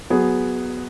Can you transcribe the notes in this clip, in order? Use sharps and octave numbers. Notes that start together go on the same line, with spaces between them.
F#3 B3 G#4